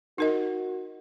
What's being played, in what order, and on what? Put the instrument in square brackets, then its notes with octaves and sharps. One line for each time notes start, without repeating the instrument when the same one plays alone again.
[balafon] D#4 A#4 D#5 [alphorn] F#4